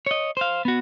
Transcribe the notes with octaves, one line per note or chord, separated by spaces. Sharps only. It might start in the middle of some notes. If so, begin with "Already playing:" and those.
C#5 D#5
C5 F5
B3 F#4